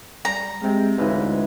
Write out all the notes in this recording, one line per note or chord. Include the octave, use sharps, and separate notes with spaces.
G3 A#5
C3 G#3 C4 A#4
D2 G#2 C#3 E3 B4